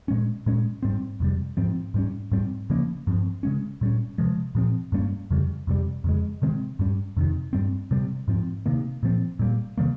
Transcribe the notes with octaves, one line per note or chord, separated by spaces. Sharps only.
A#2 G#3 C#4
A#2 G#3 C#4
G#2 G3 C4
F2 C3 G3
G#2 F3 C4
G#2 G3 C#4
G#2 G3 C4
C#3 F3 A#3 C#4
G2 F3 C4
C#3 G#3 C#4
A#2 G3 C#4
C3 F3 G#3
A#2 F3 C4
G2 G3 A#3 C#4
F2 C#3 G3
F2 C3 G3
F2 C#3 G#3
C3 D#3 G#3 C4
G2 G3 C#4
F2 C3 D#3
G2 G3 C4
C3 G3 C4
G#2 F3 C4
C3 D#3 A#3
A#2 F3 C4
A#2 G3 A#3
C3 D#3 G3 A#3